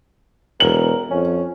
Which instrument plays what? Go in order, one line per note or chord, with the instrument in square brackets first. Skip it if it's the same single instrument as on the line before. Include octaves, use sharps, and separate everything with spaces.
[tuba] E1 [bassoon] A#4 [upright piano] F#7
[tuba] F2 [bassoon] C#4